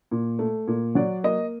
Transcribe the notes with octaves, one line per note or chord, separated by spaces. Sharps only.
A#2
A3
A#2
F#3 D5
A#3 D#5